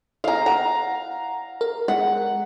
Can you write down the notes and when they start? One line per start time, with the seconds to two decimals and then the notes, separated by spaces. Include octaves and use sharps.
0.24 F5 A#5
0.46 F#5 A#5
1.61 A#4
1.88 G#3 F#5